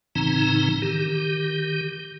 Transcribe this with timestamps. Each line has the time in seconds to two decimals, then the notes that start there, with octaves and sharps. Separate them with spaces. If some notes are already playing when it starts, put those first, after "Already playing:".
0.15 A2 C#3 E3 C4 D#4 A#5
0.82 D#3 G4